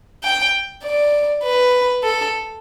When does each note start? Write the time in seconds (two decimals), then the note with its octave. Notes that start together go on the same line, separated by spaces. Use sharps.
0.23 G5
0.84 D5
1.43 B4
2.04 A4